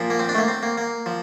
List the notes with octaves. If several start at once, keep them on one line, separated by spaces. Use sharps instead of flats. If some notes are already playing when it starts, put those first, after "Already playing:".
Already playing: A#2 F3
A#3
C4
D4
A3
A#3
C4
A#3
A#3
F3